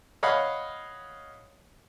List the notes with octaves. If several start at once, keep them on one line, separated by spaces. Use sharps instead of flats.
C#5 D#5 F5 F#5 B5